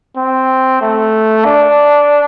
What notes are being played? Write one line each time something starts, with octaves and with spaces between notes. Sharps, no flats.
C4
A3
D4